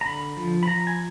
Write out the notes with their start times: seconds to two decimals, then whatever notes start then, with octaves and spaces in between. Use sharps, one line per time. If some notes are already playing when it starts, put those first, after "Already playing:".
0.01 A#5
0.05 D3 B5
0.37 F3
0.63 B5
0.67 F3 A#5
0.87 G#5